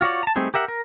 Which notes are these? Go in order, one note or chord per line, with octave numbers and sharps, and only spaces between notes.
F4 F#4 C#5 D5
A5 A#5
G3 A3 C4 D#4 G#4
G4 A#4 E5 F#5
A#4